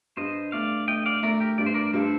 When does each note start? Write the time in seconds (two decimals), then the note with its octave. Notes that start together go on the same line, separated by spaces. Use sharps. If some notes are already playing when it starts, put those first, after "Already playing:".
0.17 G2 C5 D#5
0.52 A3 D5 F5
0.88 A3 D#5 G5
1.06 D5 F5
1.23 A3 A#4 D5
1.40 G4 A#4
1.58 G2 D5
1.66 C5
1.74 A#4 D5
1.93 G2 A4 C5